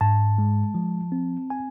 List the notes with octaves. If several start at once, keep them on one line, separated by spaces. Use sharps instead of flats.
G#2 A5
G#3
F3
C4
G#5